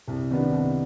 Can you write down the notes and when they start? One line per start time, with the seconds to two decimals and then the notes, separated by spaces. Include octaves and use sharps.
0.08 C2
0.30 C3 D#3 B3 D4
0.52 C2